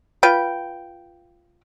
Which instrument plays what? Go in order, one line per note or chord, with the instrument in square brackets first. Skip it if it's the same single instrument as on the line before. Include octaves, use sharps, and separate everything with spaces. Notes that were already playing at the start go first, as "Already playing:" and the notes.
[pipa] F4 B4 G5